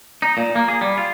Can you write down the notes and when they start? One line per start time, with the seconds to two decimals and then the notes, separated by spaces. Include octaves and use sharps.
0.22 D#4
0.37 A#2
0.56 A#3
0.68 G#4
0.81 G3
0.98 F4